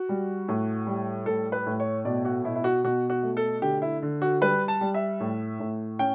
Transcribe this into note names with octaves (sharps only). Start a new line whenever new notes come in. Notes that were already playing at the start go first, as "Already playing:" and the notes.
Already playing: F#4
G3
A2
G3
A2 A4
B4
A2
C#5
B2 D5
F#4
B2 E4
E4
F#4
B2 F#4
F#4
A3
A4
D3 G4
E4
D3
F#4
G3 B4
A5
G3
E5
A2
A2
C#4 G5